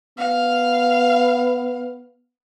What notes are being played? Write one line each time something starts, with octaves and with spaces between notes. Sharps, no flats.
B3 F5